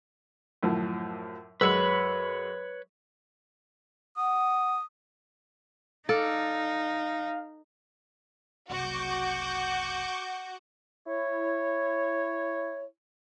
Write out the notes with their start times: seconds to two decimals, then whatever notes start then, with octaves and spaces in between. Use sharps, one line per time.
0.63 F#2 A2 F3
1.61 F#2 G#3 B4 C#5 B5 E6
4.17 F#5 D#6
6.09 D#4 A4 D5 F5
8.70 F#1 C2 F#4 C#6 D6 G6
11.07 E4 C#5